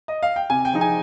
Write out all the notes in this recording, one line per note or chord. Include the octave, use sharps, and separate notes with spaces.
D#5
F5
G5
C3 G#5
G5
F3 G#3 C4 D#4
G#5